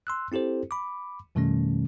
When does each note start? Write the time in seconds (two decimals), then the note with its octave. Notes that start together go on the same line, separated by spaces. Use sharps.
0.07 C6 E6 F#6
0.32 C4 E4 G4 A4 C5
0.71 B5 D6
1.35 F2 B2 D#3 G3 A3 C#4